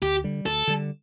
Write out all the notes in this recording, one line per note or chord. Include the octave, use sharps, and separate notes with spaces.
D2 G4
D3 G3
D2 A4
D3 G3